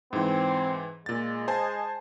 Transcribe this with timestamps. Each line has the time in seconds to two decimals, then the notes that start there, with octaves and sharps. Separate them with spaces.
0.13 G#2 E3 C4
1.06 A#2 G#3 A6
1.48 C5 G#5 A5